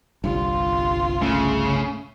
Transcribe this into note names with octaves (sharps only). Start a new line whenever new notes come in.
G1 C2 G2 F4
C#3 A3